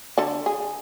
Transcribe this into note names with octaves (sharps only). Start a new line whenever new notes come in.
D3 A4
G#4